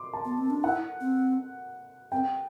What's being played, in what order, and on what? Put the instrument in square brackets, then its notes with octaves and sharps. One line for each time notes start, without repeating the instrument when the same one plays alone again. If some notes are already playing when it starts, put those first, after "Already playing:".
Already playing: [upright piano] C6 D6
A5
[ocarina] B3
C4
D4
[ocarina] E4 [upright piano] F#5
[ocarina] C4
[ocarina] C4 [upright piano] G5